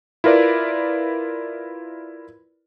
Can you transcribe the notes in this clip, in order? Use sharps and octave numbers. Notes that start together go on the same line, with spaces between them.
E4 F4 A#4 B4 D5